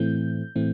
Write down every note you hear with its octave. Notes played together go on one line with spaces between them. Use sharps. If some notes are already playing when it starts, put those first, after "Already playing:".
Already playing: A2 E3 A3 C4 G6
A2 E3 A3 C4